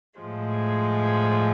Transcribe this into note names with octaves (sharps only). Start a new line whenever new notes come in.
A2 F3 G#3